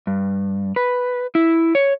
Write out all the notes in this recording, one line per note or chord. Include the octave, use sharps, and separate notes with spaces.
G2
B4
E4
C#5